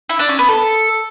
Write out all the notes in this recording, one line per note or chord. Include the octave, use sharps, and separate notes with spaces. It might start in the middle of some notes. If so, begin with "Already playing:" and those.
E4
D4
C#4
B3
A4